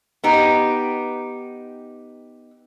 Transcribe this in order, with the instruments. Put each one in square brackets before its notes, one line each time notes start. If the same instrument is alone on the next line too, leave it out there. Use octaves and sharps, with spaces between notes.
[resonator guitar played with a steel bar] B3 D#4 G4